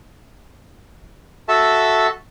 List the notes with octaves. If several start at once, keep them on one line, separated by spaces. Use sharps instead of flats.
F#4 A4 E5 A5